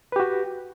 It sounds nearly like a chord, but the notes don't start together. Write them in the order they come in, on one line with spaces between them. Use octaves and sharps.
B4 G4 F#4